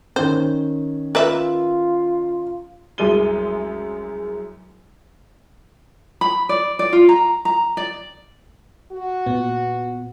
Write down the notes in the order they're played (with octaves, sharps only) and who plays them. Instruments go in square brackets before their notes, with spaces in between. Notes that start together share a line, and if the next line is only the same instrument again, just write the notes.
[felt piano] D#3 C#4 [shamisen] C5
[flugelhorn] F4 [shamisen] A#4 B4 E5
[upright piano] C2 F#2 G#3 G#4 D#7 G7
[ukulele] B5
D5
D5
F4
A#5
A#5
D5
[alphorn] F#4
[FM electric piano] A#2 B3